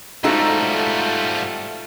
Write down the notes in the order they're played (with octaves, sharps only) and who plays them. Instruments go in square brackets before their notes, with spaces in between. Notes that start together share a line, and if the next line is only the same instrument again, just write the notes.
[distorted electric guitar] G#2 G3 [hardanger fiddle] A3 F#5 [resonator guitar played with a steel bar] D#4 F#4 A4 [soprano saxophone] F4